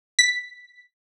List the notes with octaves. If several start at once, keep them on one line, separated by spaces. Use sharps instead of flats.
B6